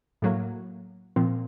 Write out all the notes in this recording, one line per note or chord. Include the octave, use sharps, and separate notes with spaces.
A2 F#3 A#3
A#2 F3 C4